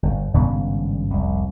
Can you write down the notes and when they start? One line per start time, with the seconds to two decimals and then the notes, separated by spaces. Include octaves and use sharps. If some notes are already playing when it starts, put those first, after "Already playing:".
0.03 G1
0.33 G#1 G2 C#3 B3
1.11 F1 C2